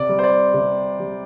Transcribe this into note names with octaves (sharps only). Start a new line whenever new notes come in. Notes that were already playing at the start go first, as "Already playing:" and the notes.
Already playing: C3 D5
G3
C5
D5
C3
G3